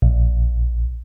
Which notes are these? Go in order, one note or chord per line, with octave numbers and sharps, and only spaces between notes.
A#1